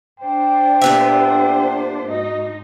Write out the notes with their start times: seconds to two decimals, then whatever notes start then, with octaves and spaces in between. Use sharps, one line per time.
0.20 D4 C5 G5
0.82 A#2 B3 G4 E5
2.08 G#2 D#4 F#4 D#5